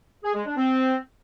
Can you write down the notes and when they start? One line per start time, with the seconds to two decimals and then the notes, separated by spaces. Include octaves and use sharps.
0.23 G#4
0.34 G#3
0.45 D4
0.56 C4